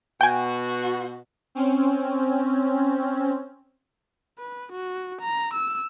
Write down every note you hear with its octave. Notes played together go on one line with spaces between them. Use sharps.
B2 F#4 G5 G#5
C4 C#4
B4
F#4
A#5
E6